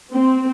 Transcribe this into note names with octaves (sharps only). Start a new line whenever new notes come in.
C4